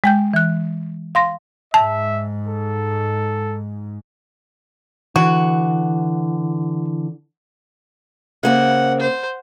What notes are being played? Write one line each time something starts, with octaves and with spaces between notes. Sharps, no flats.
G#3 G5 G6
E3 F#6
F5 C6 A#6
G#2 E5 A5
A4
D3 E3 F#4
C#3 A#3 C4 F#5
C5